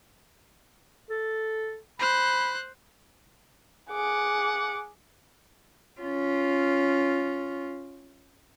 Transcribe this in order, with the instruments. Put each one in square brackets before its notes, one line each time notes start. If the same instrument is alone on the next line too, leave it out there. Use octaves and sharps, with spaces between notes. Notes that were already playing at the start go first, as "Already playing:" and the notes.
[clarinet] A4
[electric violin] C5 F#6 [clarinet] B5
[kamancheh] G#4 D6 [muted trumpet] F#5
[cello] C#4 F4